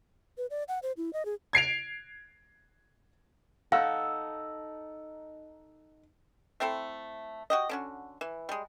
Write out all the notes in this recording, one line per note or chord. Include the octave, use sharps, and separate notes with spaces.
B4
D5
F#5
C5
E4
D#5
G#4
G#6 C7 D7 F7
D#4 A4 F5 F#5
A3 C4 E4 A4
F#4 G4 D#5
D3 C#4 F#4
E3
G3 G#3